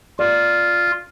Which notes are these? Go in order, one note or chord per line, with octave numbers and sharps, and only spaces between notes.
F4 D5